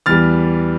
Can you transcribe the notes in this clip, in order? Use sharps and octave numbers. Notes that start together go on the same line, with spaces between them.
E2 E3 G3 F6 A6